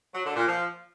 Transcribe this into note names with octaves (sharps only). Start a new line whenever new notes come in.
F#3
D3
A#2
F3